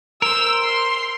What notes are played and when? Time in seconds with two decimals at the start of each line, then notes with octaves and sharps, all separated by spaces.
0.22 A#4 C5 E6
0.64 C6